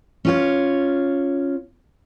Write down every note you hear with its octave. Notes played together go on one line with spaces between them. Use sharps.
C#4 F4 C#5